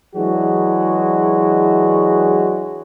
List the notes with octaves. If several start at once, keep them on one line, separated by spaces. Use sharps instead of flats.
E3 F#3 G#3 D4 F#4 G#4